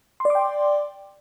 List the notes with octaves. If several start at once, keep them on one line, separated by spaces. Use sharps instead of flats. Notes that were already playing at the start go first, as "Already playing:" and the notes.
D5 G5 C6 D6